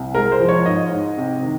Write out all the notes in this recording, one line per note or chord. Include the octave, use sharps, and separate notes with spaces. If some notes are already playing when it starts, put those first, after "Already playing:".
Already playing: C2
G#3 A#4
C5
F3
C#5
G#2 D#5
G#2
C3
D#3